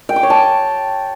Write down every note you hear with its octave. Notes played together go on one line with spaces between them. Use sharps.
G5
D6
C#5
A5